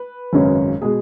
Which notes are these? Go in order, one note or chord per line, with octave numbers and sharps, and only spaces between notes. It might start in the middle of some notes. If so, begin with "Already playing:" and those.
Already playing: B4
G#1 F#2 C#3 G#3 C#4
B2 G#3 G#4